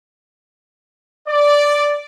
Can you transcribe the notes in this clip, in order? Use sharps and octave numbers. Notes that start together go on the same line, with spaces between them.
D5